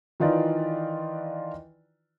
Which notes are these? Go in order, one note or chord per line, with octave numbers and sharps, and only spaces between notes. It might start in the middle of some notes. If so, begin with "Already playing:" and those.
D#3 E3 D#4 F4 B4 D5